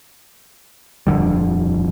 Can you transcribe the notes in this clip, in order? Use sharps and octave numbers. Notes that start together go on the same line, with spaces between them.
D#1 F2 D3 G3